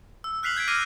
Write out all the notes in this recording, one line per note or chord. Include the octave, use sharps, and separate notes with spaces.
E6
F6 F#6 B6 C7 F7 F#7
G6 G#6 B6 D7
D6 F6 A#6 C7 D#7